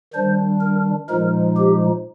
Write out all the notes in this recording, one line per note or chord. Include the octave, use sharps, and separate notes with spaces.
D#3 G3 D4 C5
A#4
A#2 F3 G#3 D#4 A#4
G4